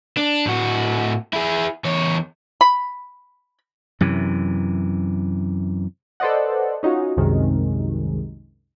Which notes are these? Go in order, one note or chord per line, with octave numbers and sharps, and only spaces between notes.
D4
A2 F#4
E4 G#4
E2 C#5
B5
F#2 C3 E3
A4 B4 C5 D5 D#5 F#5
C#4 D#4 F4 F#4
C2 F#2 C3 D#3 G#3